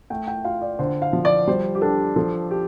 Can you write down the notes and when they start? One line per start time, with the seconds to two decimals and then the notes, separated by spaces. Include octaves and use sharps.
0.10 A3 G5
0.27 G5
0.44 F4 F5
0.62 D5
0.79 D3 C5
1.02 F5
1.13 F3
1.25 D5
1.47 G3 C5
1.75 G4
1.82 D4 A4
2.16 F3 A4
2.51 G4